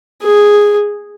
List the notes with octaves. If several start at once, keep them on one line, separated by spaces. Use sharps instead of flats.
G#4